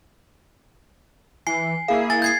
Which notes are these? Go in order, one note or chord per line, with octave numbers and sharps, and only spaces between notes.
E3 G#5 C7
A#3 E4 G#4 F5
G#5 A6
G6 G#6 C7